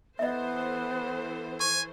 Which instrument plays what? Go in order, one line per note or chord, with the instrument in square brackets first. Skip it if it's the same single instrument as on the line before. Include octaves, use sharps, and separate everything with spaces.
[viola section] E3 A4 C5 [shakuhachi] B3 [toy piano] D#5 E5
[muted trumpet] G#5 [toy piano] C#6